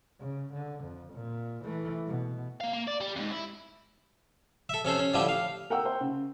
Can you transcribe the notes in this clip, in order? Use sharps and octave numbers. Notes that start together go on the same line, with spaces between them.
C#3
D3
F2
A#2
E3 A3
B2
A#3 F5
A#3
D5
G3
F2 G#2
E4
A4 E5
C3 C#4 A4 C5
C#4
A2 D3 F3 G3 A3 G4
F5
A#4 F#5 G5 E6
C5
C#3